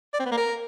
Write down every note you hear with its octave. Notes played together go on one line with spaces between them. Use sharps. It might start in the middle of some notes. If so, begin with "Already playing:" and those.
D5
C4
B3
A#3
A#4